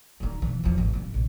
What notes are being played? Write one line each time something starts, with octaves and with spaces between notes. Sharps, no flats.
D2 D#4
B2 E3
E2 F3
G#1
C3 D#3
A#1